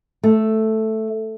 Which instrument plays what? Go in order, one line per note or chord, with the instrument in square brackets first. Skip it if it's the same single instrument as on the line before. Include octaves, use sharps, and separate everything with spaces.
[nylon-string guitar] A3